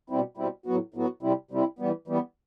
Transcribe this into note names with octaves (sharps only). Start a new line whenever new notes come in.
B2 G3 C4 E4
B2 G3 C4 E4
A2 F#3 B3 F#4
A2 F#3 B3 F#4
C3 G3 C4 E4
C3 G3 C4 E4
E3 G3 B3
E3 G3 B3